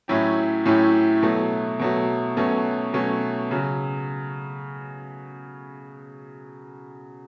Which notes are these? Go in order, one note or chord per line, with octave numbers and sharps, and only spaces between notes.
A2 F#3 C#4 E4 G4
A2 F#3 C#4 E4 G4
B2 F#3 A3
B2 F#3 A3
B2 F#3 A3 C#4
B2 F#3 A3 C#4
C#3 F#3